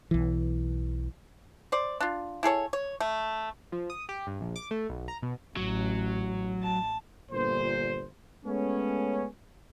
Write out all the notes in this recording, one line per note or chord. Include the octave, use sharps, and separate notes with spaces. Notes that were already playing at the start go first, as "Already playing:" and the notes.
B1 E3
C5 D5
D4 F4
E4 G#4 A4 C#5
C#5
A3
F3
D#6
G4
G2
A#1
D6
A3
B1
A#5
B2
A1 F#3
A5
G1 A#2 C5
G#3 A3 B3 C#4